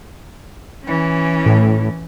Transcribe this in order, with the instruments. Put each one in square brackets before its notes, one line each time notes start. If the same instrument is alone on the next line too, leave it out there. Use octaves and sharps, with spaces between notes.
[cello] E3 C#4
[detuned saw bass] A2